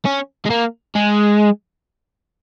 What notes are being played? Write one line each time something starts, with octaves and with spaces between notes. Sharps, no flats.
C#4
G#3
A#3
G#3